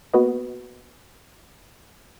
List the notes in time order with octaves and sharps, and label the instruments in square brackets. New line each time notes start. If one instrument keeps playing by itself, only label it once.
[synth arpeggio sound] A#3 B3 F#4 B4 D#5